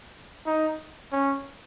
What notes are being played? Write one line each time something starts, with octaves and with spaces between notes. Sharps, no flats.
D#4
C#4